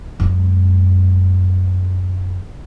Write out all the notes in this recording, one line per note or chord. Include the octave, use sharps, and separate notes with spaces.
F#2 G#3